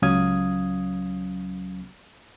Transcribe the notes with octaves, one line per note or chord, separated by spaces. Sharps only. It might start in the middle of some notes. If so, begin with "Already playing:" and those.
C#2 F#3 C#4 F5 D#6 G#6